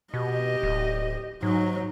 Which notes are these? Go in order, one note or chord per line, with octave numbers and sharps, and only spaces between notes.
B2 G4 D#5
D1
G#2 F#3 D#4